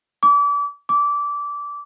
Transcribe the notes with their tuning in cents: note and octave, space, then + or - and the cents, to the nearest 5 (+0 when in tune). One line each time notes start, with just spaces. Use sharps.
D6 -35
D6 -20